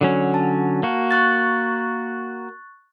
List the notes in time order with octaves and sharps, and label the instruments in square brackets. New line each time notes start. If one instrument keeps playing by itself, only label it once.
[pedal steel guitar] D3 F#3 C#4
[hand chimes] A5
[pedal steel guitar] A#3 F#4
[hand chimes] C#6 F#6 A6